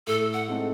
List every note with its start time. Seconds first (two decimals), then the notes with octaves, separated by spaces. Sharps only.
0.07 A2 A4
0.34 F#5
0.47 G#3 C4 D#4 A4